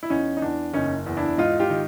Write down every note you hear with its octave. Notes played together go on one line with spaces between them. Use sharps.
E4
E2 C#4 D#4
D#4
E2 D4
F#1 C#4 D#4
E2
D4 E4
G#2 D#4 F4
F4 G4
D#3